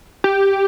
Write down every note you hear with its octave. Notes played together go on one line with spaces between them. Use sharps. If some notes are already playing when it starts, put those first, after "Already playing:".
G4